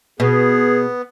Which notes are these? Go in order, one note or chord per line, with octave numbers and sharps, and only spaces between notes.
B2 B3 G#4